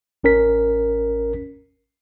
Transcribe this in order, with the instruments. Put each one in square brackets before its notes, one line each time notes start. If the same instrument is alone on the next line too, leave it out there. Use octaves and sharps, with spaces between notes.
[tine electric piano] A1 C#4 A#4 B6